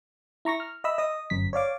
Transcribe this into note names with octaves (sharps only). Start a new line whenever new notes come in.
E4 A#5 C#6 A#6
F6
D#5 E5 B5 E6
D#5 D#6
G1 F#2 B6
C#5 D5 F5 D6